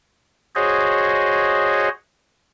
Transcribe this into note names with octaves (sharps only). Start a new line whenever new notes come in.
F#4 G#4 C5 C#5 D#5